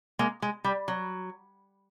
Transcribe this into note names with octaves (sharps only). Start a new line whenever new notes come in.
G#3 A#3
G#3
G3
F#3